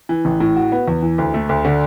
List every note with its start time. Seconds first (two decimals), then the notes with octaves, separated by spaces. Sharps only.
0.09 E3
0.25 A1
0.40 A2
0.56 F#4
0.72 B3
0.88 E2
1.02 E3
1.18 D2
1.34 A3
1.49 D2
1.65 D3